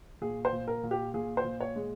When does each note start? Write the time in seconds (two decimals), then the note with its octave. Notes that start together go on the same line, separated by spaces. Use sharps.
0.21 A#2 G#4
0.45 C5
0.52 A#2
0.68 A#4
0.83 A#2
0.91 G4
1.14 A#2 G#4
1.37 C5
1.44 A#2
1.61 C#5
1.76 G#3